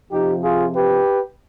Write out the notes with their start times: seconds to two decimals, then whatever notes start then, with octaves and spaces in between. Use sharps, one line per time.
0.11 F2 C3 F3 D#4 G4
0.43 F4 G#4
0.75 G4 B4